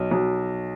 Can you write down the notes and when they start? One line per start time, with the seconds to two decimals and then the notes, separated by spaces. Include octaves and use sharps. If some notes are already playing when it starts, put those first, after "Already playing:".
Already playing: B1
0.11 B1